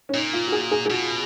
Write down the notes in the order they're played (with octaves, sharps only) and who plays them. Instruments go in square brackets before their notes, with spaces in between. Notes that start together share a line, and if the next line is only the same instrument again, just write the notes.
[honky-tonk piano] C#4
[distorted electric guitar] A#2 [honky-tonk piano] D#4
[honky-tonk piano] F4
F#4
G#4
G#4
G#4
[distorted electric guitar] B2 [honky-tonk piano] F#4